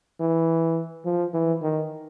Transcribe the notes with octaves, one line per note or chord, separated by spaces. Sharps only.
E3
F3
E3
D#3